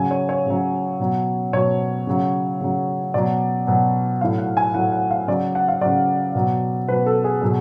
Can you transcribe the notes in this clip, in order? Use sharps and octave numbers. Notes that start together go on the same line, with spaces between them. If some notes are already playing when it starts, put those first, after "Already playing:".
Already playing: C#3 F#3 G#5
C#5
C#5
C#3 F#3
B2 F#3
B2 F#3 C#5
C#3 F#3
C#3 F#3
B2 F#3 D5
B2 F#3
A2 F#3 F5
F#5
G#5
A2 F#3 F#5
F#5
F5
C#3 F#3 D5
F#5
F5
C#3 F#3 D5
B2 F#3
B2 F#3 B4
A4
G#4
B2 F#3